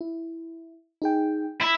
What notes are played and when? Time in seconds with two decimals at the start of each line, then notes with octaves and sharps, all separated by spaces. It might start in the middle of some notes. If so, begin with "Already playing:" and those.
0.01 E4
1.02 D#4 G#4 G5
1.61 E4